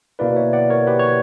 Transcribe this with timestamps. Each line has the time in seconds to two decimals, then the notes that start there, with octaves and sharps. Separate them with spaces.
0.19 B2 A#3 E4 B4 D5
0.36 C#5 E5
0.53 D5 F#5
0.70 A#4 C#5
0.87 G4 B4
0.99 C#5